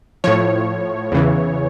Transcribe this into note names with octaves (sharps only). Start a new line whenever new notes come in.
A2 F3 C#5
E2 C#3 E3